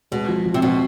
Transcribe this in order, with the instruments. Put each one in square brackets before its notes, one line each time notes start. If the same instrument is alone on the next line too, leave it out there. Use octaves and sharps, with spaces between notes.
[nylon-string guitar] B2 [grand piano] G#3
[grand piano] F3
F3
[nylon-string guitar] C3
[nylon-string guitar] B2 [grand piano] C4